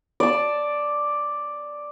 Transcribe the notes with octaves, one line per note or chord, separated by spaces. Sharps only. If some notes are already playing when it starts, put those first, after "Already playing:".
D5 A5